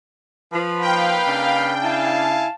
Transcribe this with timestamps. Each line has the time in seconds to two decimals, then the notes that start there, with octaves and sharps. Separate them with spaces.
0.52 F3 B4 B5
0.81 A#3 D#4 F5 G5
1.26 C#3 D4
1.83 E4 F5 G#5 A5